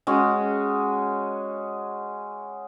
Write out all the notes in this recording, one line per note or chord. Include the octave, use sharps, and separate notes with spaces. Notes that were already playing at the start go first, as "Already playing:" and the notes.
G#3 C#4 F#4